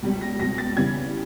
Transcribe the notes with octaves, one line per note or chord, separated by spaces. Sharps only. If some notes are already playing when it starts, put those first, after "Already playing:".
C#2 B2 G3
A#6
C#2 B2 G3 A#6
A6
E2 C#3 E3 G3 G#6